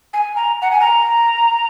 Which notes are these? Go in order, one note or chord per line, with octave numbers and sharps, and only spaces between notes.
G#5
A#5
F#5
G#5
A#5